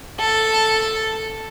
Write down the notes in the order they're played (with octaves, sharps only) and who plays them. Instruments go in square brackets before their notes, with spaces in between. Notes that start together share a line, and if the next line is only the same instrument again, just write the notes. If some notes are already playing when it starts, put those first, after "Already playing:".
[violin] A4